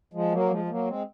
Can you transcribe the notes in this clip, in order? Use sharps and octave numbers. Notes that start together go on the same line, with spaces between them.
F3 G#3
F#3 A#3
F3 G#3
G#3
F#3 A#3
G#3 C4